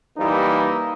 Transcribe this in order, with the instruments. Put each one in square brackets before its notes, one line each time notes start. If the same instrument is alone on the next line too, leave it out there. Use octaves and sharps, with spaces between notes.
[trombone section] E3 G3 A#3 D#4 E4